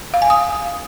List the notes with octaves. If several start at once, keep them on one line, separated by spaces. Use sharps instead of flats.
F5
G#5
D#6